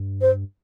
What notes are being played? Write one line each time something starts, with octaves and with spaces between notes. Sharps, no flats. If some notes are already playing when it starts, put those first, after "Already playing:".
Already playing: G2
C5